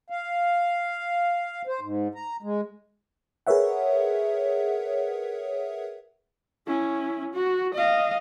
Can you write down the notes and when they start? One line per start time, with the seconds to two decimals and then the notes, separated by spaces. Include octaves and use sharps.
0.10 F5
1.67 C5
1.81 G#2
2.15 A#5
2.43 G#3
3.47 G#4 A#4 B4 C#5 E5 F#5
6.67 C#4 E4
7.33 F#4
7.74 D#5 F5